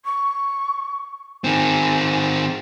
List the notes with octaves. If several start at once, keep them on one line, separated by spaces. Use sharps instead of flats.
C#6
D#3 C4 G#5